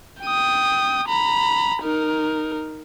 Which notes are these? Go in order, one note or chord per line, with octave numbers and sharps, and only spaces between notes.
G5 D#6
A#5 B5
D#4 A#4